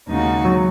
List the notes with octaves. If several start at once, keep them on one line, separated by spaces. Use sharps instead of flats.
D#2 C#3 G#3 D#4 F#4
F#3